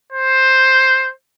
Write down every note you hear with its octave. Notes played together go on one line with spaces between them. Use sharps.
C5